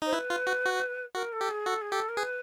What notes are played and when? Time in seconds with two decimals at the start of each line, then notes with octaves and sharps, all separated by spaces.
0.02 D#4 C5
0.13 E4 B4
0.30 F4
0.47 F#4
0.65 F#4
1.15 F#4 A#4
1.32 A4
1.41 G4
1.50 G#4
1.66 F#4 A4
1.81 G#4
1.92 G4 A4
2.09 A#4
2.17 G#4 B4